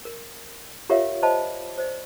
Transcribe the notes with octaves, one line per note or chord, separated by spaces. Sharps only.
A#4
F4 G4 A#4 C#5 E5 F5
C5 D#5 F5 A5 B5
C5 D5